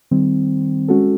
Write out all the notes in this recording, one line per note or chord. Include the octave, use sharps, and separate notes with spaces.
D#3 G3 C4
G#3 C#4 F#4 A4